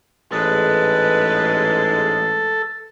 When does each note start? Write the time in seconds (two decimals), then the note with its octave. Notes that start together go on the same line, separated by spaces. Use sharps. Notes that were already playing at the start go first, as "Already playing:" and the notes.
0.32 A1 G#2 G#3 A4 B4